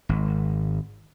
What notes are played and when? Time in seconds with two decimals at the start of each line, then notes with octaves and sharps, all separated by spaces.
0.09 G#1